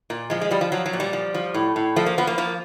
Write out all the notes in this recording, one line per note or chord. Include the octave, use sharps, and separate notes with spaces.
A#2
F3 G#3
G#3
F3 G3
F3
F3 F#3
F#3
A#2
G3
F3
F3
A2
A2
F3 A3
A#3
F3 B3
A#3
F3 A#3